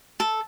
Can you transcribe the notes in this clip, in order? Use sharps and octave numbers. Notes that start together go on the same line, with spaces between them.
A4